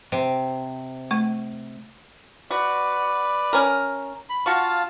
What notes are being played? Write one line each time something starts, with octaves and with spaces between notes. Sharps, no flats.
C3
A3 C#6
F#4 B4 D5
C#4 A#4
B5
F4 F#4 F5 A5 C#6